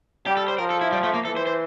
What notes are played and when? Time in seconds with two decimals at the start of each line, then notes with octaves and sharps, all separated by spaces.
0.26 G3 G4
0.37 A4
0.48 C5
0.58 F3 A#4
0.70 A4
0.81 E4
0.92 G3
1.03 A3
1.14 A#3
1.25 E3 A4
1.37 C5
1.47 C5